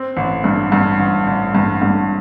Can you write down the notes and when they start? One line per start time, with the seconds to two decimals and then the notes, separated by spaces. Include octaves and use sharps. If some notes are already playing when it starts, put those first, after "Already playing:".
Already playing: C4
0.17 A1
0.44 G2
0.72 G2
1.00 A1
1.27 A1
1.55 G2
1.82 G2